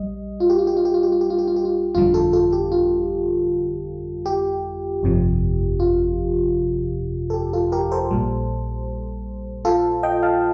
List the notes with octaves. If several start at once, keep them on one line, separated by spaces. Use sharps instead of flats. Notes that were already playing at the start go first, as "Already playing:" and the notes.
Already playing: A#1 G3 D#5
F4
G4
F4
G4
F4
G4
F4
G4
F4
G4
F4
G4
F4
G4
F4
G1 F2 D3 G3 F4
F4 A4
F4 A4
G4
F4
G4
G1 F2 C3 F3
F4
A4
G4
F4 A4
G4 A#4
A4 C5
A#1 A#2 G3
F4 A4
D#5 G5
F5 A5